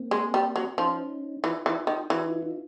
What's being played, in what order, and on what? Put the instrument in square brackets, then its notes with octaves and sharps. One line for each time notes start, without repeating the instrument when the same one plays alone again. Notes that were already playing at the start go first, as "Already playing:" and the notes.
Already playing: [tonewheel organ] A#3 C4
[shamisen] G#3
G3
F#3
[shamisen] F3 [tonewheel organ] C#4 D#4
[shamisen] E3 [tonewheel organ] D#4 F4
[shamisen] E3
D#3
[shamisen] E3 [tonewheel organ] E4 F#4
[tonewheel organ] D#4 F4
E4
D#4 F4